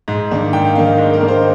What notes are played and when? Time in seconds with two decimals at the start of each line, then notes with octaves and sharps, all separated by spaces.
0.08 G#2
0.31 D#3 A#3 D4
0.53 G#2 G5
0.64 F5
0.75 D#3 A#3 D4 F5
0.87 D#5
0.98 G#2 D#5
1.13 A#4
1.21 D#3 A#3 D4
1.28 C5